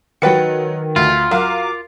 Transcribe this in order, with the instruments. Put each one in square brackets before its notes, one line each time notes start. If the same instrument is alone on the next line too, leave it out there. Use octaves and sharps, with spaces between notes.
[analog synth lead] D#3 [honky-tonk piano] F#3 A6 C#7 [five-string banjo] F#4 B4 G5
[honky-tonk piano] D2 [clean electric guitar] F4
[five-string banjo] F#3 [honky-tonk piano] A#4 F5 [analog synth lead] D6